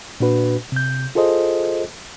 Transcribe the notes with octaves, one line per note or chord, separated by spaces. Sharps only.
A#2 D4 F#4 B4
C3 G6
F4 G#4 A4 C5 D#5